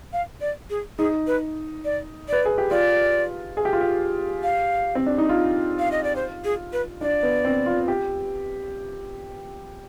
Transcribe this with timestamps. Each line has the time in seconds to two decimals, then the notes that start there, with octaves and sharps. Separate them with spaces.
0.13 F5
0.41 D5
0.70 G#4
0.98 D#4 G#4
1.27 B4
1.85 D5
2.28 B4 D5
2.45 G#4
2.58 G4
2.71 F4 D5
3.57 G#4
3.65 G4
3.73 F4
3.81 G4
4.43 F5
4.95 C4
5.06 D4
5.18 D#4
5.29 F4
5.79 F5
5.92 D#5
6.04 D5
6.16 C5
6.44 G#4
6.73 B4
7.01 D4 D5
7.23 B3
7.45 C4
7.66 F4
7.88 G4